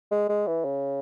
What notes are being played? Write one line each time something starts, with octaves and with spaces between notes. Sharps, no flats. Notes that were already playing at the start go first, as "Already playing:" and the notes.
G#3
G#3
E3
C#3